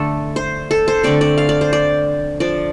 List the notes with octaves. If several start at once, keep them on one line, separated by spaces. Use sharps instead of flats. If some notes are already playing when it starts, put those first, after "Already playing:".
Already playing: D3 A3 D4 A4
C5
A4
C5
D3 A3 C4 D5
D5
F5
D5
C5
D5
F3 D4 D5